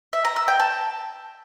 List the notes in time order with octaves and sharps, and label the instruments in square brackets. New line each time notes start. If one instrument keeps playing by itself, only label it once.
[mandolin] E5
A#5
E6
G5
A5